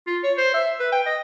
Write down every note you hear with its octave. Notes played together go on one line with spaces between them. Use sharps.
F4
C#5
C5
E5
B4
G5
D#5